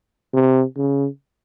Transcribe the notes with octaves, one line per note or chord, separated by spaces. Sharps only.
C3
C#3